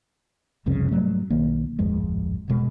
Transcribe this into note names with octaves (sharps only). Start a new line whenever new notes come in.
F#1 C2 F2 C#3
G#2 F#3 G3 A3
B1 D#3 A#3
D1 G#1 F2 G#3
G1 E2 B2 G#3